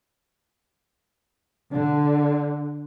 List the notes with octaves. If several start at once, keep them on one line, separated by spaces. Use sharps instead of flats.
D3